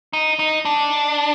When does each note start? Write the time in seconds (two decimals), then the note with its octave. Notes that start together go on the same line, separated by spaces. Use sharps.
0.13 D#4
0.39 D#4
0.65 D4